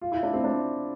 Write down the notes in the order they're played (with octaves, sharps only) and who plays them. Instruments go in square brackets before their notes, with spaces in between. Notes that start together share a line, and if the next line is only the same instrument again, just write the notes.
[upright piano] F4
E4
D4
C4
D4